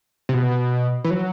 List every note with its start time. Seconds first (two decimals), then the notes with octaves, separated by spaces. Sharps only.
0.29 C3
0.34 B2
1.04 E3
1.10 F#3